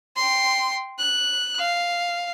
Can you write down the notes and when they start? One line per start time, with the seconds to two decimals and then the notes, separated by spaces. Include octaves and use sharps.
0.16 G5 C6
0.98 F#6
1.58 F5